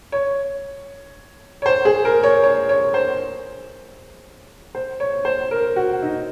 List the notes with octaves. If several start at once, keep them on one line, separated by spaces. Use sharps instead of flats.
C#5
C#5
C5
G#4
A#4
C#5
C#5
C#5
C5
C5
C#5
C5
A#4
F#4
D#4